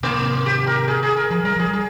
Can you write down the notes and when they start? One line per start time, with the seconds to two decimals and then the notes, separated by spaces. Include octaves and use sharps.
0.03 C3 D#3 A#3
0.46 G4
0.67 A#4
0.88 G#4
1.03 G#4
1.17 A#4
1.30 F3 G#4
1.44 G3 A#4
1.56 F3 G#4
1.69 G3 G#4